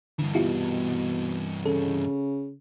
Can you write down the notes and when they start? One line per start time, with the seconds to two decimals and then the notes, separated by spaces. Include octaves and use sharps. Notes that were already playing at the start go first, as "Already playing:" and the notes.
0.19 G2 D3 E3
0.35 B2 E4 F4 G4
1.65 C#3 A4